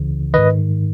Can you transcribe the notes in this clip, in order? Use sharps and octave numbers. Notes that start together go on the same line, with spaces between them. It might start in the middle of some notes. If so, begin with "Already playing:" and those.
Already playing: C#2 C#3 E3
G#2 D#3 B4 D#5